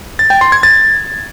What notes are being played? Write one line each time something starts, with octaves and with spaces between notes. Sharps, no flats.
A6
G5
C6
G#6
A6